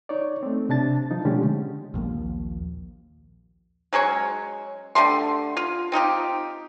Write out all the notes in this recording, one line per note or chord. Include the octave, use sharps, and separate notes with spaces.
D#4 C#5 D5
A3 C4
C3 D4 A5 A6
F3 D#4
B2 D3 G#3 A3 C#4 G4
A#1 D#2 F3 A#3
F#3 G#3 C#4 C#5
D3 G3 A3 C6
F4
C4 D#4 F4 G4